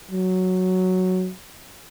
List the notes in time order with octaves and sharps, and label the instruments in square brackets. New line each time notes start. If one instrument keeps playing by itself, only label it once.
[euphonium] F#3